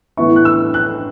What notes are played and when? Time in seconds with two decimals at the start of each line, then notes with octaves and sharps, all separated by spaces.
0.17 A2 E3 B3 E4 C#6
0.36 F#6
0.45 E6
0.74 F#6